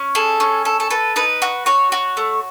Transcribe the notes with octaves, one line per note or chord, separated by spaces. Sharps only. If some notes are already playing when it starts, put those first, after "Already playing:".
Already playing: C#4
G#4 A4
C#4
A4
A4
A4 B4
D#4 B4
F#4
F#4 C#5
F#4
A3